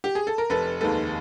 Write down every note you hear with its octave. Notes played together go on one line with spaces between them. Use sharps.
G4
G#4
A4
A#4
F1 A4 B4
D#2 D#3 G#3 A4 B4